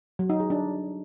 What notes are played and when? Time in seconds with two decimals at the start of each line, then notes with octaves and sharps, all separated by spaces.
0.19 F#3
0.30 D#4
0.40 G#4
0.50 D4